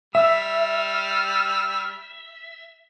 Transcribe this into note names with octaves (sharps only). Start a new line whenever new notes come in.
G3 E5 E6 F6